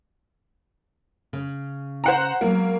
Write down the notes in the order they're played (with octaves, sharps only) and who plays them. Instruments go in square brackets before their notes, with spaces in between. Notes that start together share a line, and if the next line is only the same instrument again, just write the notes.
[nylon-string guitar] C#3
[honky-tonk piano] C5 F#5 A#5
[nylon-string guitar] F#3 G#3 B3 [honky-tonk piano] A#3